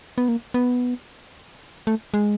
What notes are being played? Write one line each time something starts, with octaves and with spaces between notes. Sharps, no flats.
B3
A#3
B3
A3
G#3